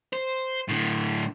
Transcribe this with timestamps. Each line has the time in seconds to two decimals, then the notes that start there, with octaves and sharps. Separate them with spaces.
0.13 C5
0.69 A2 D3